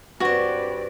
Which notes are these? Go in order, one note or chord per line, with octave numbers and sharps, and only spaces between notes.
G2 C4 F#4 B4 D5